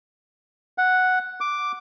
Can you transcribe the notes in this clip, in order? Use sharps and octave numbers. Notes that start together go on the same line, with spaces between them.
F#5
D6